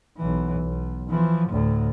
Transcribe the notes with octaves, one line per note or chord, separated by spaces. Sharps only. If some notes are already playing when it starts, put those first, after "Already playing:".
B1 E3
B1
E3 F3
D2 A2